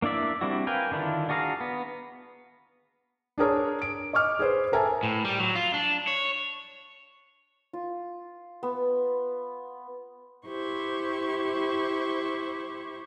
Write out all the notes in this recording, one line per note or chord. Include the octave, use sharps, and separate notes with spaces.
A#3 D4 E4 D5 E5
G3 C4 D4 E4 F#4
A#4 B4 F5 G5 G#5
D3 D#3 D4 E4 F4
D4 F#4 G#4 F5 A#5
B3
D4 G#4 A#4 C#5
D7
D#5 C#6 D6 F6
G#4 B4 C5
A4 A#4 E5 G#5 A5
A2
G3
F#3
F4
D4
C#5
F4
B3
E4 G4 C5 C#6